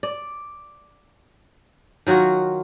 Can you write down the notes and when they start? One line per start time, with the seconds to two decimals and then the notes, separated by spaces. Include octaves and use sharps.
0.03 D5
2.07 D#3 F#3 F4 F#4